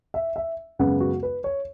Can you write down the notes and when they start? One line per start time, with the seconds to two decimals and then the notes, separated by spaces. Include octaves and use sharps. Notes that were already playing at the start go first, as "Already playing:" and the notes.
0.14 E5
0.36 E5
0.79 F#2 C#3 G#3 B3 F#5
1.00 F#4
1.23 B4
1.44 C#5